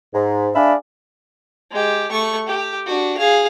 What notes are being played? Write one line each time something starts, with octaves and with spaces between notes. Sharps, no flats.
G#2
D4 G#4 D5 E5 F5 B5
G#3 G4
A3 C#6
G4
D4 F#4
G#4 F5